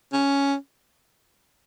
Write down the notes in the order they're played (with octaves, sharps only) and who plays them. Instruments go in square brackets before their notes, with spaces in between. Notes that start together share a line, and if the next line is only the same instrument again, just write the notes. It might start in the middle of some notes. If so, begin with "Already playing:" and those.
[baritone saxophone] C#4